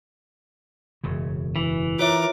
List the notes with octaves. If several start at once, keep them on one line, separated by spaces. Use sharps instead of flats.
E1 F#2 C#3
E3
F4 A#4 C#5 E5 D6